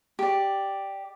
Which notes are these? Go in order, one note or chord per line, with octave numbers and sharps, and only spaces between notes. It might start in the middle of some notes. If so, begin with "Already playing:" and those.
G4 D5